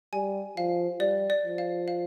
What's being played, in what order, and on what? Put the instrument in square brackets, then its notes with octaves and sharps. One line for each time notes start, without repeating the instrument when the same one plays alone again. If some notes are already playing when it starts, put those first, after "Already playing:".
[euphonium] G3 [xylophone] G#5
[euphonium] F3 [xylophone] F5
[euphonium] G3 [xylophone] D5
[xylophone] D5
[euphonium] F3
[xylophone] F5
F5